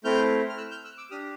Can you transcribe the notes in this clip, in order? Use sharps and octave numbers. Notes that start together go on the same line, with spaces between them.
A3 C4 E4 F6 G6
F6
E6 F#6
F6 G6
E6 F#6
D6 E6
D4 G4 D#6 F6